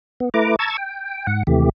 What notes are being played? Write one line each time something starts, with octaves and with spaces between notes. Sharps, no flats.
B3
A3 E4 B4 A#5 D6
A5 A#5 C#6 E6 G#6 A6
G5
G#2 F#5
D#2 C3 E3 A3 G4